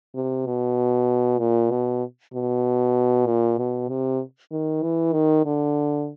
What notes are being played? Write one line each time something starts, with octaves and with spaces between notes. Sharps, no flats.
C3
B2
A#2
B2
B2
A#2
B2
C3
D#3
E3
D#3
D3